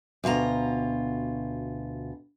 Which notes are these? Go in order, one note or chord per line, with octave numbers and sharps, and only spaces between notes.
D2 B2 F4 A#5